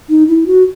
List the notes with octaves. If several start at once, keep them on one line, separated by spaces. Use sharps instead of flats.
D#4
E4
F#4